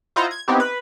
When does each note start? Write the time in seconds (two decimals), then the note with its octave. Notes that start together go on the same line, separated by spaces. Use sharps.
0.16 E4 F4 C5 D#5 F#5 A#5
0.31 G#6
0.48 B3 C4 D#4 E4 G4
0.60 B4